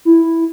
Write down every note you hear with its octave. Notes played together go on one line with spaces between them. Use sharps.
E4